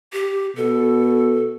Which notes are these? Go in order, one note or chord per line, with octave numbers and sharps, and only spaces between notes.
G4
B2 A4